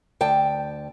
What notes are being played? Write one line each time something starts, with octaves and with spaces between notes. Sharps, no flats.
D2 G5 A5